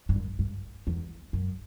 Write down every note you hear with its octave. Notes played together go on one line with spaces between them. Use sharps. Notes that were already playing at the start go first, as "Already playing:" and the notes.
G2
F#2
G2
E2
F#2